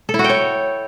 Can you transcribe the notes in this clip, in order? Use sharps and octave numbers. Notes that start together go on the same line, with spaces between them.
A4
E4
F#4
G5
C#5